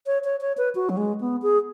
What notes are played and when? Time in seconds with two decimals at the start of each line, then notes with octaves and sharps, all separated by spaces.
0.06 C#5
0.24 C#5
0.41 C#5
0.58 B4
0.75 F#4
0.90 F#3
0.97 G#3
1.21 B3
1.42 G#4